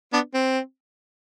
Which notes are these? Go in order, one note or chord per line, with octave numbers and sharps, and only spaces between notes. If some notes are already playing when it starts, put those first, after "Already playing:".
B3 D4
C4